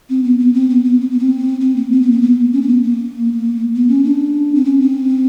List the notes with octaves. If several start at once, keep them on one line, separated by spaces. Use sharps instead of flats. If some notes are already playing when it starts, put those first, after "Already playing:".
C4
B3
B3
C4
B3
B3
C4
B3
C4
C4
A#3
C4
B3
A#3
B3
C#4
A#3
B3
A#3
B3
C#4
D4
C4
C#4
C4